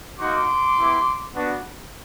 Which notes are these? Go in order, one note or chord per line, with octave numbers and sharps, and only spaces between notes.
A#3 D#4 F#4 C6 D6
B3 E4 G4
B3 D4 F#4